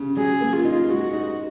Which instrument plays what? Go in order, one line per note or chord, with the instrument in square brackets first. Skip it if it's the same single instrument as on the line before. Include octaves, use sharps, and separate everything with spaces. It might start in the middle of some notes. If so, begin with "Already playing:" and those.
Already playing: [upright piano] C#3
[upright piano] F#3 [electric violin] G#4
[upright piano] A#3
[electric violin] F4
[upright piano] D#4
[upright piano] G#3 [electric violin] F#4
[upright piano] D#4